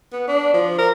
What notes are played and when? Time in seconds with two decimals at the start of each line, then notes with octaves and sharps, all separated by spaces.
0.13 B3
0.28 D4
0.54 F3
0.78 A#4